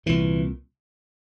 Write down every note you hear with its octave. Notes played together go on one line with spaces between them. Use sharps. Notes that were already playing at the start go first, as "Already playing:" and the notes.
C2 A#2 E3